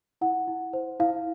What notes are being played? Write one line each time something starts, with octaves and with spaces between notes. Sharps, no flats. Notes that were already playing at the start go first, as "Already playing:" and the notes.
E4 F#5
E4
C5
E4 F5